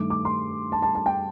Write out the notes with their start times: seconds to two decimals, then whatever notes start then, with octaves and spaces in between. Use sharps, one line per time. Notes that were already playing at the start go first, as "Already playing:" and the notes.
Already playing: G2 D#3 A3 D6
0.10 D6
0.25 C6
0.72 A5
0.82 A5
0.95 A5
1.06 G5